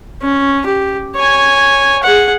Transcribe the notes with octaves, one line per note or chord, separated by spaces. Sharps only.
C#4
G4
C#5 G#5
G#4 F#5